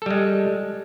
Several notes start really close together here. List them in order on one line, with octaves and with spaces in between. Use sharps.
A4 G3 G#3